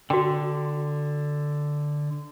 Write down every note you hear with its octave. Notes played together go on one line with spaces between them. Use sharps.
D3 F#4 G5